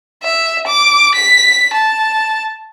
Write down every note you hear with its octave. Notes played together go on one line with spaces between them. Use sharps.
E5
D6
B6
A5